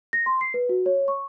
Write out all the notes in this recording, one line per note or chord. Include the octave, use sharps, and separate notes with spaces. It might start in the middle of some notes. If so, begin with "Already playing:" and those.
A#6
C6
C7
B4
F#4
C#5
C#6